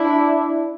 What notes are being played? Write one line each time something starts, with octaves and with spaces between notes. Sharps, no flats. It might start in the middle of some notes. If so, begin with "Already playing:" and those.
Already playing: D4 E4